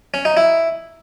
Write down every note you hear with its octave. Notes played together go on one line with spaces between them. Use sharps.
C#4
D#4
E4